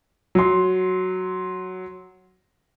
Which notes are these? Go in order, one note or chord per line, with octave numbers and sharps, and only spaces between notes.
F#3 C6